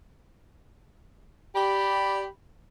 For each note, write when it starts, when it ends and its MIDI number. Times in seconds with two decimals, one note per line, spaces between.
1.55 2.24 67
1.55 2.24 74
1.55 2.28 83